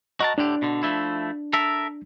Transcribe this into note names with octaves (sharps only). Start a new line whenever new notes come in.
F#4 A#4 D#5 A5
A2 D3 D4 G4
B2 D3
F3 A3 E4
A4 A#4 E5